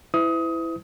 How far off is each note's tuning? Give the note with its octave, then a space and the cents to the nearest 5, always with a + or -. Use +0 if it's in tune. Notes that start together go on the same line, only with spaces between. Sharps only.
E4 +0 B4 +45 D#6 +20